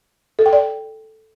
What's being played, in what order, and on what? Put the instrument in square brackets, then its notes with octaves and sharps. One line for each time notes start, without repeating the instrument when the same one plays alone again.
[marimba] A4
G5
D5